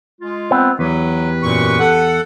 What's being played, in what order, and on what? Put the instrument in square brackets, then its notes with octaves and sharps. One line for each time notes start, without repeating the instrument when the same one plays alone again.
[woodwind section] G#3 F4
[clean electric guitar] B3 C4
[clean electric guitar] E2 [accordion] F#3 [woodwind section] G4 B4
[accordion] F#2 A#2 C#6
A4 F#5